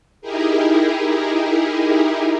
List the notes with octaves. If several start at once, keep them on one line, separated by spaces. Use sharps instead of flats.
D#4 E4 G4 G#4 A#4